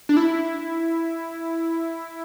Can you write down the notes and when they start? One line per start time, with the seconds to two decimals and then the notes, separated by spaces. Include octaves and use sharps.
0.09 D4
0.17 E4